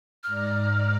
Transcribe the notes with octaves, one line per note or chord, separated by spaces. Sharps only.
G#2 D5 A#5 F6